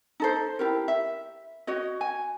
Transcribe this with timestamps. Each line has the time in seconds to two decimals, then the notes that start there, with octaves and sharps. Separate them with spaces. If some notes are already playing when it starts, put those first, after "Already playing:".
0.20 D#4 A4 C5
0.59 E4 G4 A#4
0.88 E5
1.67 F#4 C#5 D#5
2.01 G#5